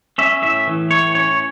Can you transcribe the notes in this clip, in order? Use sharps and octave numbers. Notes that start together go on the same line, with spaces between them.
C#4 E5
A2 E5
E3
A2 C#5
C#4 C#5